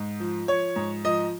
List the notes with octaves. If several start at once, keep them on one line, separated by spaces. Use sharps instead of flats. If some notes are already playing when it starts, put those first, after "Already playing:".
Already playing: G#2
F3
F3 C#5
G#2
F3 D#5